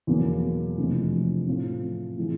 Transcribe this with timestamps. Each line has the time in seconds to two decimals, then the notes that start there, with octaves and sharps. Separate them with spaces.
0.07 E2 B2 F#3 A#3
0.77 F2 C3 E3 A3 D4
1.47 A2 F3 A3 C4 F4
2.17 A2 E3 G#3